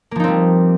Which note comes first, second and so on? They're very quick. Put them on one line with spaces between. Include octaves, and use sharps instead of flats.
A#3 F3 D#4 C4 G3